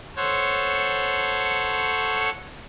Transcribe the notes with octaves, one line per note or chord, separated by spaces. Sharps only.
A4 C5 C#5 F#5